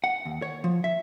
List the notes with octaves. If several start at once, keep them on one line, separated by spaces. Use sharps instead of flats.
F#5
D#2
C#5
F3
E5